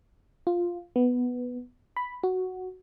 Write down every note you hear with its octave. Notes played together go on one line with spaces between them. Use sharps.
F4
B3
B5
F#4